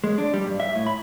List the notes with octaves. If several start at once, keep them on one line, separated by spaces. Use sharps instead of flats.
G#3
D4
G3
G2
E5
A2
B5